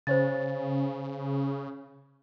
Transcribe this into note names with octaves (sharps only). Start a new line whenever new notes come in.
C#3 C5 C#5 A6